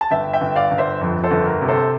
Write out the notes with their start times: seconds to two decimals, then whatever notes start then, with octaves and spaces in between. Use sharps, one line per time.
0.01 A5
0.11 G1 E5 G5
0.33 E5 G5
0.41 G1
0.56 D5 F5
0.71 G1
0.78 C5 E5
1.01 F2
1.24 A4 C5
1.31 G1
1.46 A#4
1.61 C3
1.68 A4 C5